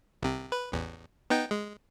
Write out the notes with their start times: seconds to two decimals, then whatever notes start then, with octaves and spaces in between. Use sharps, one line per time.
0.22 C2 C3
0.52 B4
0.72 A1 E2
1.30 B3 D#4 G5
1.51 G#3